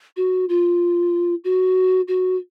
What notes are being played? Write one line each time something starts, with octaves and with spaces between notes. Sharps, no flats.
F#4
F4
F#4
F#4